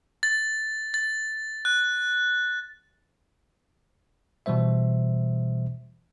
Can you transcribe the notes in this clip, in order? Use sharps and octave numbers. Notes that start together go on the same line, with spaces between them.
A6
A6
F#6
B2 E3 G3 C5 E5